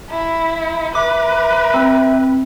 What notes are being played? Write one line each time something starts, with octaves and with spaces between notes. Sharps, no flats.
E4
B4 E5 D6
C4